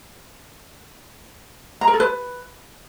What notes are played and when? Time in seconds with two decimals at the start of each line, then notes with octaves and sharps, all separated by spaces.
1.81 A#5
1.87 A#4
1.94 A4
2.00 B4